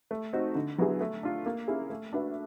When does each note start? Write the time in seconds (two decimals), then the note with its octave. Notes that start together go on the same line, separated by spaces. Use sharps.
0.11 A3
0.33 C4 D#4 F#4
0.55 D3
0.78 F#3 B3 E4 G#4
1.01 A3
1.23 D4 F4
1.46 A#3
1.68 C#4 E4 G#4
1.90 A3
2.13 D4 F#4 B4 E5